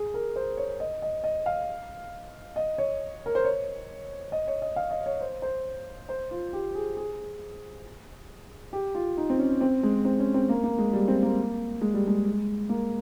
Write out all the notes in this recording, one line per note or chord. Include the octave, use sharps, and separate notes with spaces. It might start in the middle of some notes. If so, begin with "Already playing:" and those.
Already playing: G#4
A#4
C5
C#5
D#5
D#5
D#5
F5
D#5
C#5
A#4
C5
C#5
D#5
C#5
D#5
F5
D#5
C#5
C5
C5
C5
F4
G4
G#4
G#4
G4
F4
D#4
C4
C#4
C4
G#3
C4
C#4
C4
A#3
A#3
G#3
G3
C4
A#3
G#3
G3
G#3
A#3